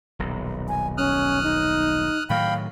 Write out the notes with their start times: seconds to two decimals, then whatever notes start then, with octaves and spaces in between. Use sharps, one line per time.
0.19 D#1 B1
0.68 G#5
0.98 C#4 D#6 F6 F#6
1.43 D#4
2.30 A2 D#3 F#3 F5 G5 B5